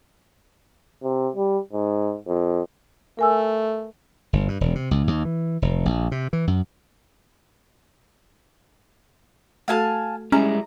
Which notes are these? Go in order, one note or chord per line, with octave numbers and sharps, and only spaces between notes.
C3
G3
G#2
F2
A3 A#4 G#5 E6
G1
G2
E1
C3
C#2
D#2
E3
F1
A#1
C3
E3
F#2
A3 F#4 A4 F5 G#5 A5
G3 G#3 C#4 E4 A#5